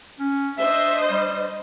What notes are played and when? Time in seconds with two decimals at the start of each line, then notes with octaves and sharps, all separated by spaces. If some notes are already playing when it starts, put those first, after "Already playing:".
0.19 C#4
0.58 D4 C5 D#5 E5
1.11 G3